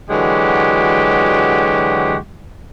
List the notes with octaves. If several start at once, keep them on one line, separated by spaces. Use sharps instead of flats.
D3 E3 F#3 G#3 F#4 G4